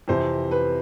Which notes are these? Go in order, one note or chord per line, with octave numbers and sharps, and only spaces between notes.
F2 C3 E3 C5
B4